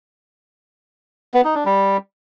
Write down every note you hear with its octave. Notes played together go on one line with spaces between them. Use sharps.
B3
D#4
D4
G3